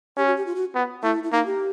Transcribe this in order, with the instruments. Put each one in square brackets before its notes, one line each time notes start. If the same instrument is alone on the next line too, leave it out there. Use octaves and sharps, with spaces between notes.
[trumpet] C#4 [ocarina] G4
[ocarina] F#4
G4
F4
F#4
[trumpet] B3
[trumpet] A3 [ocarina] E4
[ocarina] E4
[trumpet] A#3 [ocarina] D#4
[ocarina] G4